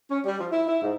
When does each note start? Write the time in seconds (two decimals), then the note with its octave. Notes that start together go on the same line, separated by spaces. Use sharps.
0.11 C#4
0.25 G3
0.40 F3
0.51 E4
0.68 E4
0.82 G#2